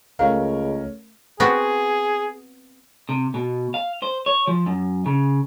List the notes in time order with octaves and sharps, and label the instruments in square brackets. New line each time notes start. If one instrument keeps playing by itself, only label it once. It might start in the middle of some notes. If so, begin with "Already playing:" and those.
[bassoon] C#2 [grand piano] A3 C#4 A#4 [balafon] F5
[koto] B3 C4 F#4 [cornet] G#4
[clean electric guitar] C3
B2
F5
C5
C#5
F3
F#2
C#3